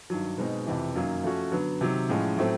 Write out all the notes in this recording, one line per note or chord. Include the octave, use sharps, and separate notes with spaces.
G2 D#3 F#3
B2 G#3 C4 D#4
F2 C3 E3
F#2 D#3 F#3 A#3
F3 A3 C#4 F#4
D3 F#3 B3
C3 D#3 F#3
A2 F3 G#3 C#4
A2 F#3 A3 C4